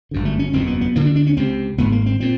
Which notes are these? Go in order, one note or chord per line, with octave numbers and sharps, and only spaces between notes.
G1 F#2 D3
A3
C#4
F#1 E2 B2 C4
B3
B3
D2 D3 A#3
D4
D4
C#4
C#2 C3 C4
G#1 G#2 B3
A#3
C4
A#2 C4